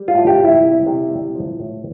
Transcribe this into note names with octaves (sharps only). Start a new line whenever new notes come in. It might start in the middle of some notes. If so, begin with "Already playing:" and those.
Already playing: G3
F4
A2
G4
G3 E4
C3
C3
G3
F3
A2